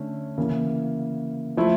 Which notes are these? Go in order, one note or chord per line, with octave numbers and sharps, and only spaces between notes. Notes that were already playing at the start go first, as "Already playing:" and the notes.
Already playing: D3 A3 C#4
C#3 E3 A#3
F3 A3 E4